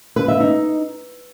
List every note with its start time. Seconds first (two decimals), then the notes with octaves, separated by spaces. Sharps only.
0.16 B4
0.28 E5
0.40 D#4